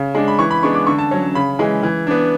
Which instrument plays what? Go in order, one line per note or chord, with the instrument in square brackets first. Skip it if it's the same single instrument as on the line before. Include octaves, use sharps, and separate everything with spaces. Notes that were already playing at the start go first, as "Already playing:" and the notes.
Already playing: [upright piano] C#3
G#3 D4
B5
E3 C#6
B5
G#3 B3 D4 C#6
D6
D3 C#6
A5
F#3 C#4
C#3 B5
E3 G#3
E3
B3 D4